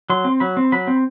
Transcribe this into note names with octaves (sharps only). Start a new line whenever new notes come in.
F#3 C6
C4
F#3 B5
C4
F#3 B5
C4